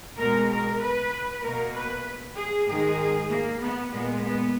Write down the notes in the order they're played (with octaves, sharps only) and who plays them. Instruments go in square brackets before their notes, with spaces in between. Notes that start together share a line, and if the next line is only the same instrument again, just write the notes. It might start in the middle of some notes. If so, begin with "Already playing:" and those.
[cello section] B2 G#3 A#4
A#4
B4
B2 A#3 A#4
B4
G#4
G#2 D#3 G#3 G#4
A#3
B3
A#2 G#3 B3
B3